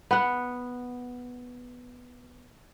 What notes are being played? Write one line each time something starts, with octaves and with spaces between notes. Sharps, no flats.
B3 F#5